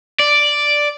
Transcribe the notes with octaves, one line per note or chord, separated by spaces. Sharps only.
D5